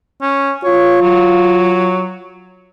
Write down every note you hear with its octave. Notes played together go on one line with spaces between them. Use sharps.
C#4
F4 C#5
F#3